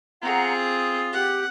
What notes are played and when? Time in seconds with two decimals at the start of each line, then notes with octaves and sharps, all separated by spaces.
0.22 C4 F4 G#4 F#5 A#5
0.54 D#6
1.13 G4 F#5